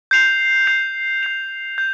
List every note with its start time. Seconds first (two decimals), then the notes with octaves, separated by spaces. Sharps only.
0.11 G6 C7 F7
0.67 G6 C7 F7
1.23 G6 C7 F7
1.78 G6